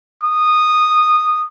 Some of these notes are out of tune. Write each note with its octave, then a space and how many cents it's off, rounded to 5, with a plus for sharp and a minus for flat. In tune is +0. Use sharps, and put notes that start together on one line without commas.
D#6 -10